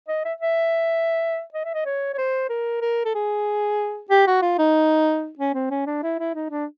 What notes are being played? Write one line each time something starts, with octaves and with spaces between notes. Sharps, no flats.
D#5
E5
E5
D#5
E5
D#5
C#5
C#5
C5
A#4
A#4
A4
G#4
G4
F#4
F4
D#4
C#4
C4
C#4
D4
E4
E4
D#4
D4